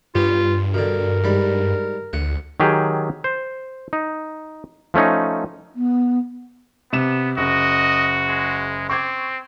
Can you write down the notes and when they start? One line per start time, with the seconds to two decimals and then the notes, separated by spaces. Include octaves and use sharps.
0.15 G2 B3 C#4 F4 G4
0.74 B2 D3 A#4
1.24 G#2 G3 B5
2.13 D2 F#5
2.60 D#3 F#3 G4 G#4
3.24 C5
3.93 D#4
4.94 F3 A3 C#4 D#4
5.75 B3
6.93 C3 B3 E7
7.38 F#1 F#4 D#5
8.28 G#3
8.90 C4 C#6 D6 G#6